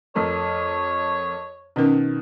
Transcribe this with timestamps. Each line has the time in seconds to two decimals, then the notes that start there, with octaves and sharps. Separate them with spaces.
0.15 F2 A3 A#4 C#5
1.76 B2 D#3 C#4 A#4